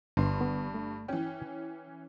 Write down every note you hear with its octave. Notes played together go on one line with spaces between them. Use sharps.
G1 G2 B4 C6
D3 B3
A3
E3 C#4 G5